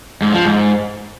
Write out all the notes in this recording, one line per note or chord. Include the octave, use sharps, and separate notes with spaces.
G#2
F3
G#2